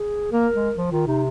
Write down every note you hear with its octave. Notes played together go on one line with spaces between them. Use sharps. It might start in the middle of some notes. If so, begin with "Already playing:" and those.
Already playing: G#4
A#3 A#4
G#3
F3
D#3 F4
C3 D#4